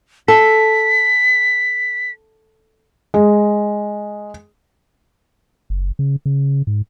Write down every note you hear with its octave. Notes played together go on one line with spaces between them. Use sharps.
A4 B6
G#3
F#1
C#3
C#3
G#2